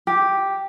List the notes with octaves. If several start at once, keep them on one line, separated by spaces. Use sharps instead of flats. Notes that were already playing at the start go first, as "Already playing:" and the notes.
G4